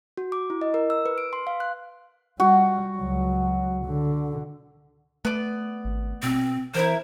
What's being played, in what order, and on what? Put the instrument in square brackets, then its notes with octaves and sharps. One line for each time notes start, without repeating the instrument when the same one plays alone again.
[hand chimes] F#4
D6
E4
D#5
A#4
E6
B4
D7
C6
F5
F#6
[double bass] G3 [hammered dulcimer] F#4
[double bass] C#2 F#3
D3
[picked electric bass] A3 [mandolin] B3 D5
[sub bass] G#1
[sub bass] B2 [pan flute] C4
[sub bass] E3 [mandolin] E4 A#4 [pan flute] C5